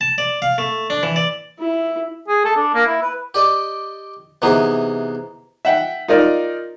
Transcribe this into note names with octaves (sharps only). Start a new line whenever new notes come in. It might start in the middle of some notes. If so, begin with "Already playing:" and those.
A5
D5
F5
A3
D4
E3
D5
E4
G#4
A4
D4
A#3
E4
B4
G4 D5 D#5
C3 E3 B3 D#4 G#4
E5 F#5 G5
D#4 F4 A#4 D5 D#5